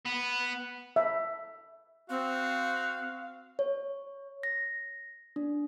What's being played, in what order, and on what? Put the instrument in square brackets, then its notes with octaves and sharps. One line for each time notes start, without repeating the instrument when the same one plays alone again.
[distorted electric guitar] B3
[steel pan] E5
[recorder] C4 [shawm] F#4 [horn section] F5
[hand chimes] C#5
A#6
D4